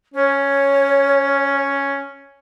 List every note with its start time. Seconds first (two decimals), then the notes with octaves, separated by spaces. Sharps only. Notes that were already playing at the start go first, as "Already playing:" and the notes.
0.14 C#4 C#5